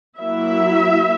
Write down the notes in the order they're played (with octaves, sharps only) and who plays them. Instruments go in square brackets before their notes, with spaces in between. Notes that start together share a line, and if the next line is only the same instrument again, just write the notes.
[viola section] F#3 A#3 E4 E5